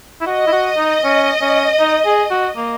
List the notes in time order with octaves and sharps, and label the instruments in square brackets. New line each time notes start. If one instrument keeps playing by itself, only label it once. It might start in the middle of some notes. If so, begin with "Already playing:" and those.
[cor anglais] E4
[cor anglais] F#4 [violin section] D#5
[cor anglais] E4
F#4
D#4
C#4
C#4
D#4
G#4
F#4
A#3